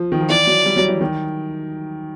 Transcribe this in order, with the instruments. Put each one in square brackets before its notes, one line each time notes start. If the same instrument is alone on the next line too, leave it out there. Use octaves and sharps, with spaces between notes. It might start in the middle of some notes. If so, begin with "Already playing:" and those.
Already playing: [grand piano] F3
D#3
F3
[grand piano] E3 [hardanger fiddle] D5
[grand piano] F#3
G3
F#3
E3
D#3